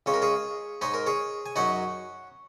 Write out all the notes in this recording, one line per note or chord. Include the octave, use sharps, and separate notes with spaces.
C#2 C#3 G#3 C#5
A#4
G#4 C#5
G#2 G#3 D#4 C#5
A#4
G#4 C#5
G#5
F#2 F#3 D#4 C#5 F#5